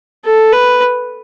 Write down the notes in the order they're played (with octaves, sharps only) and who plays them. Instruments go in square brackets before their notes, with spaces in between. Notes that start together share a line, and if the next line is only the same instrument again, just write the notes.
[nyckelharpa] A4
B4